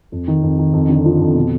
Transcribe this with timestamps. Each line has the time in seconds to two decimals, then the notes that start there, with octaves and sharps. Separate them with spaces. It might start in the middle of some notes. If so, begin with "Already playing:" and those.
0.12 F2
0.28 D#3
0.43 F2
0.59 D#3
0.73 F2
0.89 D3
1.05 F3
1.20 F2
1.35 B2